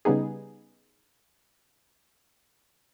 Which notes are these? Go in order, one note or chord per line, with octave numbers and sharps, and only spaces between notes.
C#3 G3 B3 D#4 G#4